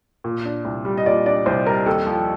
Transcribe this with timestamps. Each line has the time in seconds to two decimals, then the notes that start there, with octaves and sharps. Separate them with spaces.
0.24 A#2
0.45 D4
0.65 C2
0.85 G3
0.97 D#5
1.06 A#2 D5
1.26 D4 D5
1.46 C2 C5
1.66 G3 A#4
1.86 D#2 A4
2.07 F3